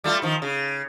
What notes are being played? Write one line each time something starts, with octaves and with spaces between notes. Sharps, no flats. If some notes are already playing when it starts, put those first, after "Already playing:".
G3 A3 F4
D#3 F3
C#3